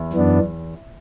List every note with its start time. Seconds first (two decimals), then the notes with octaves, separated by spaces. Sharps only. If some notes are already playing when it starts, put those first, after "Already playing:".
Already playing: E2
0.13 F#2 E3 B3 D4